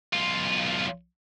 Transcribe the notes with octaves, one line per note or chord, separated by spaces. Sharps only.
B1 F4